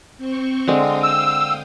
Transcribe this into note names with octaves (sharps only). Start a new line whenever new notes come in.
C4 C5 C#6
D3 G#3 C4 F5 G5 D#6
E6